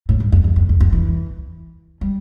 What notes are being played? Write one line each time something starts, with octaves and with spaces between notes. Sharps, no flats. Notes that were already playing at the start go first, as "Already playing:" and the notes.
A2
G2
F2
E2
F2
E2
F2
E3
G3